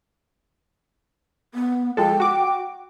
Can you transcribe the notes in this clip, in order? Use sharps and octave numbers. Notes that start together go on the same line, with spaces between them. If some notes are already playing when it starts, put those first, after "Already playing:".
B3
F3 G#3 A4 G5
F#4 D6